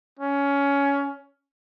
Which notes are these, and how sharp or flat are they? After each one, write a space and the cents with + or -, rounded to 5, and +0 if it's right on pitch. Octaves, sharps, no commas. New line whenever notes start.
C#4 +15